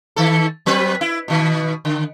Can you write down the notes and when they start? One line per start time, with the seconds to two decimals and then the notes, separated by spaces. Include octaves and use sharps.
0.16 D#3 A4
0.66 F#3 C4 B4
1.01 E4
1.28 B2 D#3
1.85 D3